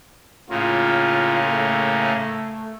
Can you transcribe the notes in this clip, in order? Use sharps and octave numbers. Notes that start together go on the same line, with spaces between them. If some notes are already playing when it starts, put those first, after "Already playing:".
A2 C#3 A#3 F4
A3